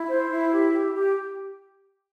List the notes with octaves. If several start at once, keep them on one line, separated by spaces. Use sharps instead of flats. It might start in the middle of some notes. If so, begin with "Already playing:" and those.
Already playing: E4
C5
E4
G4
G4
G4